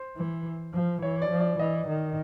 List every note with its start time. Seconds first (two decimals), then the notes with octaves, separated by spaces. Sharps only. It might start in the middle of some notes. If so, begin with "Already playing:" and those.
Already playing: C5
0.17 E3
0.74 F3
1.02 E3 C#5
1.22 D5
1.31 F3
1.40 D5
1.59 E3 D#5
1.88 D#3